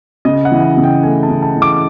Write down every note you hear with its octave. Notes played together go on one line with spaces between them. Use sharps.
C#3 D#5
F#5
E3
C#3
G5
A3 G#5
A5
C#3
A5
E3
D6